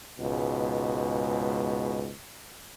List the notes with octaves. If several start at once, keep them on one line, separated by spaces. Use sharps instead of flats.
C#2 G#2 B2